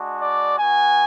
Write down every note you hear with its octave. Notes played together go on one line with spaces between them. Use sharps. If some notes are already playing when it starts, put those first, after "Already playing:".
Already playing: G#3 D4 F#4
D5
B3 F#4 G#5